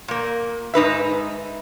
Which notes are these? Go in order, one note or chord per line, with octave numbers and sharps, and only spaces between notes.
A#2 A#3
G#2 D#4 B4 E5